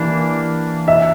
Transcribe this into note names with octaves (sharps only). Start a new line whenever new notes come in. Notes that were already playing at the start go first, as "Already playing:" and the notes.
Already playing: E3 A#3 D4 G4
E5